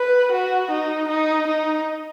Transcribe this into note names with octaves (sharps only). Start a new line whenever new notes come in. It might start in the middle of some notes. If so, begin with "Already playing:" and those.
Already playing: B4
F#4
D#4
D#4
D#4